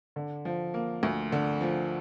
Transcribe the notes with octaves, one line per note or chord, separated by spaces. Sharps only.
D3
F3
A#3
D2
D3
F3